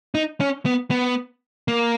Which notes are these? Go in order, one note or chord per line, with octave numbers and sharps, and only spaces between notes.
D#4
C#4
B3
B3
A#3